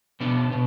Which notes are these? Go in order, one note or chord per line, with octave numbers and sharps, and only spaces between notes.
B2 B3 D4
B2 B3